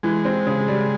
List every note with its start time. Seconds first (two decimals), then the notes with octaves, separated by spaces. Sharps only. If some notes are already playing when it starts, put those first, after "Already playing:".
0.03 E3 G#3
0.25 C4
0.47 C#3
0.68 G3